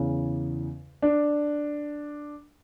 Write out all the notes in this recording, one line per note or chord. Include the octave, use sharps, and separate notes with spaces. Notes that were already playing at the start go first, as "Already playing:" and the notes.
Already playing: E2 C#3 E3
D4